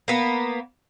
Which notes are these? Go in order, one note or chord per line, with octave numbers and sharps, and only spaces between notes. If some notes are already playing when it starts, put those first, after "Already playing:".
A#3 B3